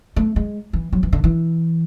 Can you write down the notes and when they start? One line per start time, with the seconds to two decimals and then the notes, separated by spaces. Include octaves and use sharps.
0.16 A3
0.36 G#3
0.73 E3
0.93 F#3
1.03 E3
1.13 D3
1.24 E3